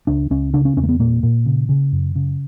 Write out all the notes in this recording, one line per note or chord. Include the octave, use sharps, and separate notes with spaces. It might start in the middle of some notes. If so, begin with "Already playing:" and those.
C#2 D4
C#2 C#4
C#3 D4
C#4
E2 C#4
A#3
B3
A#2 A#3
A#2
C#3
C#3
F#2
C#3